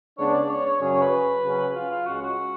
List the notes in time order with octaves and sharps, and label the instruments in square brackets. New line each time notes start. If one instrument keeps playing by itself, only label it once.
[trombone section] C#3 G#3 B3 D4 [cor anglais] C#5
[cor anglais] D5
C#5
C#5
[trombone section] F#2 C#3 F#3 C#4 G#4 [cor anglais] C#5
[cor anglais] C#5
B4
[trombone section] C#3 F#3 C#4
[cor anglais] F4
F4
[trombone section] C#2 C#3 G#3 [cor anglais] F#4
[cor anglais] F#4